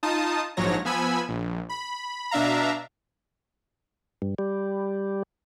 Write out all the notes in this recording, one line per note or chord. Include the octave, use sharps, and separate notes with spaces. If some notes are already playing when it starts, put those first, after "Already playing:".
D#4 F4 A5 D#6
A#1 G#2 F3 F#3 C#5 A#6
F3 B3 G#5 B5 E6
A#1
B5
B2 D4 E5 F5 A#5
G2
G3